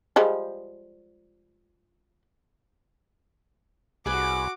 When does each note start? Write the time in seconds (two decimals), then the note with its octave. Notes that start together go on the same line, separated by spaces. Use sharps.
0.16 F3 G3 G#3
4.06 C2 F#4 G#4 B4 G#5 D6